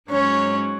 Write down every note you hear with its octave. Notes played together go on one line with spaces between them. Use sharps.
G#2 F#3 C#4 C#5